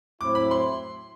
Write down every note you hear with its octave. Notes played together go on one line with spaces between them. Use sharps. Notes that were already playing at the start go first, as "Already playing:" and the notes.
A2 F#3 C4 E4 D6
B5
C6